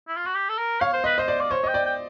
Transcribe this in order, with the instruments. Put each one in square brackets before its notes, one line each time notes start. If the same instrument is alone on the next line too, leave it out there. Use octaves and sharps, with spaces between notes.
[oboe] E4
F4
F#4
G4
A4
A#4
[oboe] C#5 [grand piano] F5
[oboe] C5
[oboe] B4 [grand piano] D#5
[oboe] C5 [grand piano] D#5
[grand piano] D5
[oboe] D5
[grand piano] C5 [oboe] C#5
[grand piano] D#5 [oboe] G5
[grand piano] D5
[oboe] G5